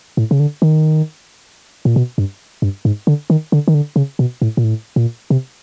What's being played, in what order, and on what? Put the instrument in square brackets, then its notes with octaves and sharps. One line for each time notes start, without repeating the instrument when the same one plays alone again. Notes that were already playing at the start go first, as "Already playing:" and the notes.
[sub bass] A2
C#3
D3
D#3
A#2
B2
G2
G2
G#2
D3
D#3
D3
D#3
D3
C#3
B2
A2
A#2
A2
A#2
C3